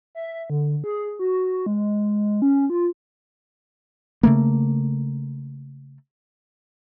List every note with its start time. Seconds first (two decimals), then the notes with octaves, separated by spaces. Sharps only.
0.15 E5
0.50 D3
0.84 G#4
1.19 F#4
1.66 G#3
2.42 C#4
2.70 F4
4.23 C#3 A3 A#3